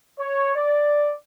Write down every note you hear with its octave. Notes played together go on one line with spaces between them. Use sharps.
C#5
D5